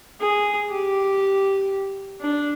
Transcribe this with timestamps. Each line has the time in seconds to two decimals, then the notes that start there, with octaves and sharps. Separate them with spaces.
0.20 G#4
0.70 G4
2.21 D4